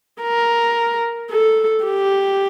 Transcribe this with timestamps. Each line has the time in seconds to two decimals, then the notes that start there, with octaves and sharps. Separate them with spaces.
0.22 A#4
1.31 A4
1.85 G4